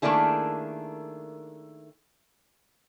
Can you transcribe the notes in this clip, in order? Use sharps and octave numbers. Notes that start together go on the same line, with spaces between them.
D#3 A3 A#3 D4 E4 G#4